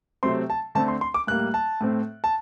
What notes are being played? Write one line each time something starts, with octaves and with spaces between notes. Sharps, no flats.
C3 F#3 A3 C4 C6
A5
D3 A3 C4 A5
C6
C6
D6
A2 G3 A#3 F#6
A5
A2 A3 C4
A5